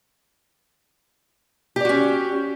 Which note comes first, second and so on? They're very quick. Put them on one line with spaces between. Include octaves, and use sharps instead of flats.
G4 D5 F#4 C#4